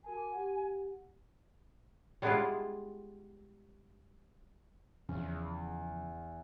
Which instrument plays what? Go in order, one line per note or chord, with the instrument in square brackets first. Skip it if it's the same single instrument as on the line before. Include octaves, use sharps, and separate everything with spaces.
[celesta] F#4 A#4 A5 [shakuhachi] G#5
[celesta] D6
G4 F#5
[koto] G3 G#3 B3 D4 E4 F4
[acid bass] E2 [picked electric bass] C#3 F3 C#4